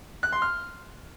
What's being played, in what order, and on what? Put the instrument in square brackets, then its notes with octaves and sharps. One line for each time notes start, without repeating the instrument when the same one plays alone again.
[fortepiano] F#6
C6
F6